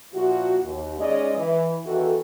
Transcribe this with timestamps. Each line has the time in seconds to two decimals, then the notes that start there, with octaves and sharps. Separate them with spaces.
0.12 A#2 F3 E4 F#4
0.63 D#2
0.99 G#3 C#4 D#4 D5 D#5
1.35 E3
1.84 E2 D#3 E3 F#4 A4